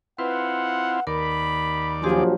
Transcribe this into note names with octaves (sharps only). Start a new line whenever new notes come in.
C4 E4 F4 B4 F#5
D#2 A#4 D5 B5
A#1 F3 F#3 G4 G#4 G#5 C6